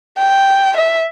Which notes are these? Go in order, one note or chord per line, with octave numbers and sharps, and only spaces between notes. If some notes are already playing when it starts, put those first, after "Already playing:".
G5
E5